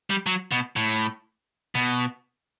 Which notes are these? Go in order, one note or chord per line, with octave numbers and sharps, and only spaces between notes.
G3
F#3
B2
A2
B2